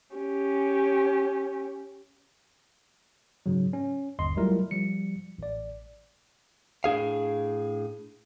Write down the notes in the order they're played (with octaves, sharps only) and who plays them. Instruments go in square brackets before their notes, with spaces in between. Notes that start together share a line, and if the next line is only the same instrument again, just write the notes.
[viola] C#4 G4
[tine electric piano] G#2 C#3 F#3
C#4
G1 D#2 D#5 C6
F#3 G3 A3 E4 F4 A#4
F3 G3 C#7
A1 D5
[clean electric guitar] A2 D4 G#4 F5